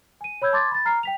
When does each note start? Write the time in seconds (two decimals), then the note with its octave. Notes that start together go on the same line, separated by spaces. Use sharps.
0.21 G#5 D#7
0.42 C#5 B5 E6 G6 G#6
0.53 A5 C6 D6 G#6 A6
0.71 B5 A6
0.85 A#5 F6 C7
1.03 G5 B6 F7